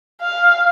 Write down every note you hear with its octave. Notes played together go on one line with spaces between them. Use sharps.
F5